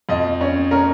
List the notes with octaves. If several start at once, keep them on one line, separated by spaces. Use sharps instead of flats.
F2 D#5
C#4 C#5
C#4 A#4